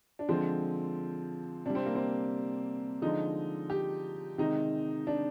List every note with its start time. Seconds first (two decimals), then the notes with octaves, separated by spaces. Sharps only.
0.19 D4
0.28 D3 F3 G#3 C4
1.66 C3 G3 D4
1.75 C4
1.86 A#3
1.95 C4
3.02 D3 F3 G#3 D#4
3.70 G4
4.38 C3 D#3 G#3 D#4
5.07 D4